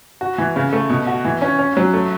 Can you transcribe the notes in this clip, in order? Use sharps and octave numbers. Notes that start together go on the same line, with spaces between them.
F#4
E3
C#3
A3
B2
F#4
E3
C#4
C#4
F#3
A3